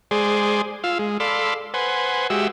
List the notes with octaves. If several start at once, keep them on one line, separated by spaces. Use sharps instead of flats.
G#3 G#4 C5 D5
F4 F5 E6
G#3
A4 D5 F5 B5 C6 E6
B4 C5 F#5 G#5
G#3 F#4 G4 E5 E6